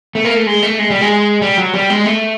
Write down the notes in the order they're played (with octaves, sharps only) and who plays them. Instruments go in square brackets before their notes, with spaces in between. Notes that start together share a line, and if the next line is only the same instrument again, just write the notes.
[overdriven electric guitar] A3
A#3
A3
G#3
A3
G#3
G3
G#3
G3
F#3
G3
G#3
A3